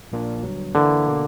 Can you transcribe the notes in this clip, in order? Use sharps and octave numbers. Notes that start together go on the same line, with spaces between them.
A#1 A#2 A#3 D4
G1 G2 F#3
D3 E3 A#3 E4
B2 A#3